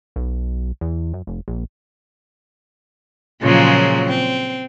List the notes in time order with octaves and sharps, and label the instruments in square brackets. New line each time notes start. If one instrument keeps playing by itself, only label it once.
[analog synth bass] B1
E2
F#2
F1
A#1
[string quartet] A#2 C#3 F3 F#3 G#3 A#3
C4